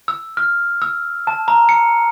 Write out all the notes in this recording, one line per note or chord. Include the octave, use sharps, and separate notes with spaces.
E6
F6
E6
A5
A#5
C#7